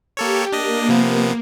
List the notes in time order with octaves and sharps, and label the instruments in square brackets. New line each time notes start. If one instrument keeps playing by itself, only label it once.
[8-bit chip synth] A#3 A4 C#5 [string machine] G4
[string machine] A#3 [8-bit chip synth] D4 D#5
[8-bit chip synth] C3 F3 B3